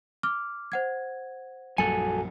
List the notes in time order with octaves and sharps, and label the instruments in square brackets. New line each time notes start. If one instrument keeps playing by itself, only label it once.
[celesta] D6 F6
C5 F#5 G#6
[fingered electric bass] A#1 F#2 G3 [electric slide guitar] F#4 A4 G#5 [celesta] C#7